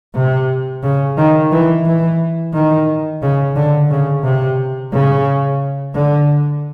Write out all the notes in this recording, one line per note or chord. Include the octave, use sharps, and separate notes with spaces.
C3
C#3
D#3
E3
E3
D#3
C#3
D3
C#3
C3
C#3
D3